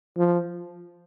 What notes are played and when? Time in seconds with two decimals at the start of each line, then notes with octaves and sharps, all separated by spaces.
0.17 F3